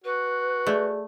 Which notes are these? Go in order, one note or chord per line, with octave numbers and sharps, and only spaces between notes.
F#4 B4
A3 G#4 D5